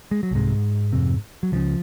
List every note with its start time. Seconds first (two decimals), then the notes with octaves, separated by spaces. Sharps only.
0.11 G#3
0.23 F#3
0.31 C2 G#2 C3 G#3
0.93 F2 C3
1.43 F#3
1.52 C#2 C#3 F3